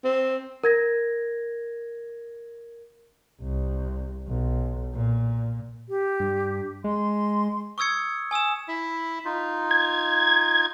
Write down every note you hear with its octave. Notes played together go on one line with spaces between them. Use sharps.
C4
A#4 G#6 A#6
C2
B1
A#2
G4
G2
G#3 C6
C#6 D#6 E6 G#6 C#7
G#5 D#6 E6 E7
E4 E5
D#4 F4
G#6